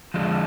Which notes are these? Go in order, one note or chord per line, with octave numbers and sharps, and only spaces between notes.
D3 F3 G#3 D4